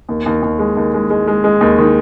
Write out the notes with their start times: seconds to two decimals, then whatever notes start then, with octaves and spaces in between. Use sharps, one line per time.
0.09 D#2
0.26 D#2
0.42 D#2
0.59 G#3
0.77 D#2
0.94 G#3
1.10 G#3
1.27 G#3
1.44 G#3
1.61 D#2
1.78 D#3